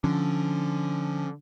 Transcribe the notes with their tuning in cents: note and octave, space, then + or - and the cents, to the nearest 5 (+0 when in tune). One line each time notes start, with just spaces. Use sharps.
D3 +0 F3 +0 C#4 +0